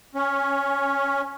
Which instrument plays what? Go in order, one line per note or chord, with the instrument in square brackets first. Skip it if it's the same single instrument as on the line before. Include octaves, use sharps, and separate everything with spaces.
[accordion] C#4